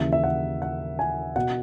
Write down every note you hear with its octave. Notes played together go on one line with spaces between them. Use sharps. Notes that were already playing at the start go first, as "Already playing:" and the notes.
Already playing: D#2 C#3 E3 E5
E5
F#5
F#5
G#5
B2 F#5